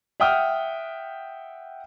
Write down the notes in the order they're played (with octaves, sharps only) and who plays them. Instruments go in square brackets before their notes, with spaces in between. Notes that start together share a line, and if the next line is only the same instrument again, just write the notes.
[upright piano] E5 F#5 G5 D#6 F6